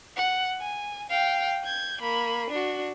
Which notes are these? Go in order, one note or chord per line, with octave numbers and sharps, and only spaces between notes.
F#5
G#5
F5 G5
G6 G#6
A#3 B5
D4 F#4